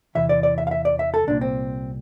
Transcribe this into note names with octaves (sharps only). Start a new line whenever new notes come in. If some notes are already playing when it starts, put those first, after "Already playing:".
E2 C3 E3 E5
D5
D5
E5
F5
E5
D5
E5
A4
C2 A#2 D4
C4